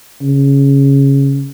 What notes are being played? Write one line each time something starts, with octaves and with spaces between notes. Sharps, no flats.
C#3